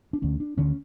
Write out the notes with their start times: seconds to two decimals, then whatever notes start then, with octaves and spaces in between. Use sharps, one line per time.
0.13 D4
0.22 D2 D3 C#4
0.40 D4
0.58 D2 D3 C#4